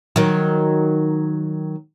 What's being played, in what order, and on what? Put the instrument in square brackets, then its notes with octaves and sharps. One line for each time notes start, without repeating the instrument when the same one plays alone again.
[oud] D#3 F#3